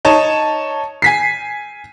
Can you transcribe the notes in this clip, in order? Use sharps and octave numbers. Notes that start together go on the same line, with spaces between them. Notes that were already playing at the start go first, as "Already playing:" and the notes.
D#4 C#5 A5
G#5 B6 C7